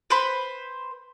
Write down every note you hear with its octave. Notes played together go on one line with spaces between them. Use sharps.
B4 C5 B5